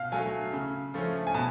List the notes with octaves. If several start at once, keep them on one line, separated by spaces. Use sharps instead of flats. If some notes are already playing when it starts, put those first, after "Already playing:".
Already playing: B2 F5
F#3 A3 G#5
C#3
F3 A3 C#4
G#5
B2 A5